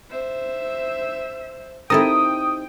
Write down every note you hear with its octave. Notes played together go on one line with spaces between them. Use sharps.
C5 E5
C4 D#4 E4 G4 A4 A#4 G5 D#6